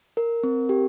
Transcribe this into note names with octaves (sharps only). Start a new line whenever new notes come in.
A#4
C4
G4